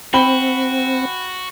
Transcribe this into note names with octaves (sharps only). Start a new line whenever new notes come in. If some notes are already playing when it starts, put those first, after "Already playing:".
C4 F#4 G5 B5 G7